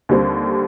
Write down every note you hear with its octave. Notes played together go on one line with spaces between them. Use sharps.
D#2 D3 G3 C4